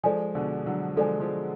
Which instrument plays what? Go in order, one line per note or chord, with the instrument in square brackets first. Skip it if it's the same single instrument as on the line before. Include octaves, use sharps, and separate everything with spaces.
[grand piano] F3 G#3 [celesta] A4 D5 G#5
[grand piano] B2 D3
D3 F#3
[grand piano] F3 G#3 [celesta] A4 D5 G#5
[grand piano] F3 G#3